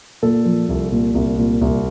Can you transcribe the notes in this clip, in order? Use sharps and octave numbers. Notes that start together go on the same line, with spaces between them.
A#2 A4
F3
C2
A#2
C2
A#2
C2